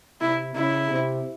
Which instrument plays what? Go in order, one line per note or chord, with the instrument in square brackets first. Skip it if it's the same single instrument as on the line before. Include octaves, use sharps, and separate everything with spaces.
[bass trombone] C3 [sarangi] E4
[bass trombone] C#3 [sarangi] E4
[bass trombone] C3